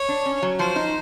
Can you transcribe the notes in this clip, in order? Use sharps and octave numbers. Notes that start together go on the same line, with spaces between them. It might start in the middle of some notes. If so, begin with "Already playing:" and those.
Already playing: C#5
D4
C#4
F#3
F3 C5
D#4